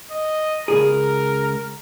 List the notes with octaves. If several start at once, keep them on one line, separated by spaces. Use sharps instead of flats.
D#5
C#2 G#2 G#4 A#4